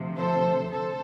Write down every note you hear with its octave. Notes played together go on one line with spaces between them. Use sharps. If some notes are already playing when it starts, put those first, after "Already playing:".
Already playing: D2 C3 F3
A4 C5
D2 C3 A4 C5